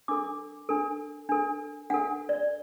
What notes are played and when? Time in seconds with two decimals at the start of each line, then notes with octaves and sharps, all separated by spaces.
0.08 D4 A4 D6
0.69 D4 A4
1.29 D4 A4
1.90 D4 A4 F#5
2.29 D5